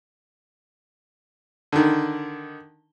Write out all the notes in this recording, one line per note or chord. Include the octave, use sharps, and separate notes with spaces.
D3 D#3